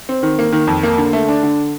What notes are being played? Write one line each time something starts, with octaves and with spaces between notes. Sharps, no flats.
C4
D#3
A#3
D#3
F2
A#3
D3
A3
D4
D3